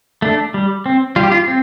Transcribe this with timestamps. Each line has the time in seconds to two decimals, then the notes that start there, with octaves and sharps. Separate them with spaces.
0.22 A3 D4
0.54 G3
0.86 C4
1.16 G3 F4
1.23 G4
1.32 F4
1.48 C4